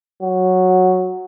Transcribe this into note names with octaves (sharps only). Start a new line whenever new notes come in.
F#3